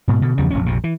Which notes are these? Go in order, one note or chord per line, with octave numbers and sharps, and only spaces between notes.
G#2 B2
B2 D3
E2 C#3 F3 G3
F1 A#1 C#4
A#1 F2 C3
E3